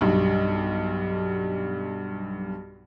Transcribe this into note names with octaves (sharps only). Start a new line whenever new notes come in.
B1 G2